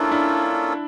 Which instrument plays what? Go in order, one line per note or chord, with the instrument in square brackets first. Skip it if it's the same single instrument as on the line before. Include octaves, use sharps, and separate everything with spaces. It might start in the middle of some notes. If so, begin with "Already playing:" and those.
Already playing: [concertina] A#3 C#4 F4 A4 [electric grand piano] D4 E4
[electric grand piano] D4 E4